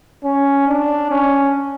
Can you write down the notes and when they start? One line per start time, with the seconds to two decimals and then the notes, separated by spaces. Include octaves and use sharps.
0.24 C#4
0.67 D4
1.11 C#4